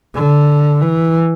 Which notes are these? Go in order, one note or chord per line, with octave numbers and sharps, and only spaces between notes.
D3
E3